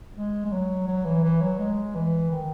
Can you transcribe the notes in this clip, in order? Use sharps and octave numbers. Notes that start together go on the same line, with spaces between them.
G#3
G#3
F#3
F#3
E3
E3
F#3
G#3
E3
D#3